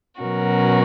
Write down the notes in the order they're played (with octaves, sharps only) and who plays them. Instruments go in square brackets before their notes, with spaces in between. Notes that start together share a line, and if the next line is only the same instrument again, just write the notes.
[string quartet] B2 F#3 C#4 F#4 A#4